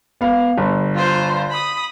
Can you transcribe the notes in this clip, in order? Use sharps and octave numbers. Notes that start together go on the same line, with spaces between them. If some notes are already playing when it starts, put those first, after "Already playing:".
B3 F5
G1
F4 C5
B5 D#6